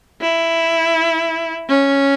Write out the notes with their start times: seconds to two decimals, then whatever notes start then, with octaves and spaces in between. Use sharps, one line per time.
0.21 E4
1.69 C#4